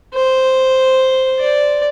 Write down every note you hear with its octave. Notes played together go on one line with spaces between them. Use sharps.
C5
D5